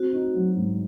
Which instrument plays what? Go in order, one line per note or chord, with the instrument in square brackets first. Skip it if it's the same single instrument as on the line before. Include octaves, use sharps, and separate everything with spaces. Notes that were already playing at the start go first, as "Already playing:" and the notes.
Already playing: [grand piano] C4 [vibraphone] F#4
[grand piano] D#4
F#3
G#2